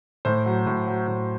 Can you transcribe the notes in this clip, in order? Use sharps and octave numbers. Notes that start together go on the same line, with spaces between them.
A2 C5
F#3
A2
F#3
A2